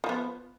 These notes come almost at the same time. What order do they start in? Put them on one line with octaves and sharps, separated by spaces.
F3 A#3 B3